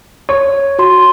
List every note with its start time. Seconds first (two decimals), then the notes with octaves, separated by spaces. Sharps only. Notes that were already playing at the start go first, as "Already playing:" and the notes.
0.29 C#5
0.79 F#4 C6